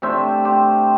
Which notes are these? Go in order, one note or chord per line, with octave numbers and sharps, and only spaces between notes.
C3 A3 D4 C5 E5
G4 C5